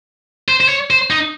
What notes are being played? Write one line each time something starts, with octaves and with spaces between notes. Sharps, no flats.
C5
C5
C#5
C5
D#4